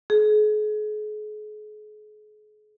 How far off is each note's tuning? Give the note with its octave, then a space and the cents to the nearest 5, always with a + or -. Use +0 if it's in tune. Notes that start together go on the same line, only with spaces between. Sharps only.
G#4 +40